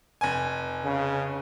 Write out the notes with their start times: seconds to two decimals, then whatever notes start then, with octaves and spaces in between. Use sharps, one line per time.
0.21 F1 G#5
0.85 C#3